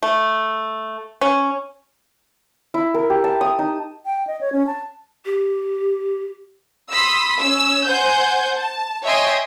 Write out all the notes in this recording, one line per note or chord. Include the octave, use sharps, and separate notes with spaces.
A3
C#4
E4
A#4
G4
A5
D#6
D#4
G5
D#5
C#5
C#4
A5
G4
B5 C6 D#6 E6 B6
C#4 E6
C5 F#5 G#5 G6
A5
C#5 D#5 E5 G5 G#5 C6